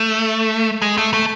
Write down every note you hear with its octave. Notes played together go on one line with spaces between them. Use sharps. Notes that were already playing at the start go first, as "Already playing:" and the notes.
Already playing: A3
G#3
A3
A3